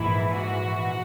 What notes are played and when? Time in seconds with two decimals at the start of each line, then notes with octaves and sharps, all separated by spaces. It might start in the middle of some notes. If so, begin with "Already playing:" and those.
Already playing: A#1 G#2 E3 E4
0.35 F#4